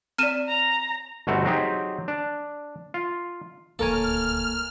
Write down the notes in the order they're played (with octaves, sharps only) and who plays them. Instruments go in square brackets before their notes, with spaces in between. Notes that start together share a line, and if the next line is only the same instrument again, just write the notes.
[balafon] C4 D5 [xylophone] F6 D#7 E7
[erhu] A#5
[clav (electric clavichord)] G1 B2 A3 C4 F#4 A#5
F#3 C4 D#4 G4 G#4
D4
F4
[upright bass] D#1 D2 [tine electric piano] A#3 A#4 G#5 [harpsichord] A4 C#5 [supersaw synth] F6